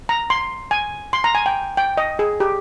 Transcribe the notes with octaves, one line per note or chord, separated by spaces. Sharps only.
A#5
C6
G#5
C6
A#5
G#5
G5
G5
D#5
G#4
G4